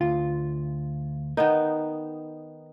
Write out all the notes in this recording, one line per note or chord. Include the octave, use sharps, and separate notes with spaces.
D2 F4
D#3 B3 D#4 A#4